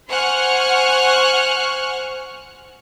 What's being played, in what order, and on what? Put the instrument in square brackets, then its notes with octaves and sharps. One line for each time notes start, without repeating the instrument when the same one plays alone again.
[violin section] C5 F#5 G#5 C#6 F6 F#6